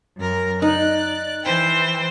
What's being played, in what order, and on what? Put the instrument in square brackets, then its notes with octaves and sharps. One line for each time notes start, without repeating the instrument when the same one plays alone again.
[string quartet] F#2 A#4
[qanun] D#4 [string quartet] D5 F#6
[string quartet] E3 C5 G5